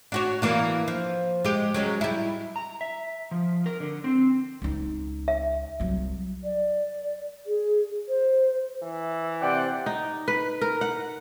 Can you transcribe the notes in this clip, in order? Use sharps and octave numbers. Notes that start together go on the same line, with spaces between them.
D4 F#4 C#5
E3 A#3 D4
F3
G#3 G4
F#3 G#3 C#4
G3 E4
A#5
E5
F3
A#4
D3
C4
C#2 D#4
E5
C2 F#3
D5
G#4
C5
E3
C3 C5 D5 F#5 G5
D#4
B4
A#4
F#5